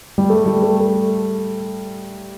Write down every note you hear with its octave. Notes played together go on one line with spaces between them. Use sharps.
G3
A3
G3
A3
A3